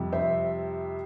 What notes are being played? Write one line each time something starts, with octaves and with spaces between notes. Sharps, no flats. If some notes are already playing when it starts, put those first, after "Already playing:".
Already playing: F2 C3 G3
C5 E5